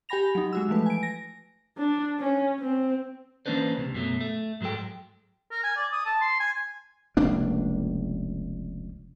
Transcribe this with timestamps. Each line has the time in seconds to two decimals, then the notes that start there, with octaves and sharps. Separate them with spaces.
0.09 G4 G5 G#5 B5 A#6 F7
0.35 F#3 D#4
0.53 G#3 F#4 E6
0.69 E3 F3 A3 B4
0.86 G#5 D7
1.03 A#6
1.78 D4
2.19 C#4
2.59 C4
3.46 E3 A#3 C#4 D4 B4 C5
3.77 C#2 C3
3.94 F#2 B2 F#3 A3
4.21 A3
4.61 G#2 F#3 G#3 A4 G5
5.51 A#4
5.64 G#5
5.77 D5
5.93 D#6
6.06 A5
6.22 C6
6.40 G#5
7.17 F1 C#2 A#3 D4